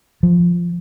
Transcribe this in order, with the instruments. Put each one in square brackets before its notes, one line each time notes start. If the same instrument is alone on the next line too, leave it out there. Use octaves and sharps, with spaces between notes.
[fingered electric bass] F3